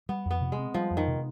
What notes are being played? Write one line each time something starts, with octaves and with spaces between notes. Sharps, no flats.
G3 B3
F2 B3
C3
G#3
C4
F3 G3
F2
D#3
C3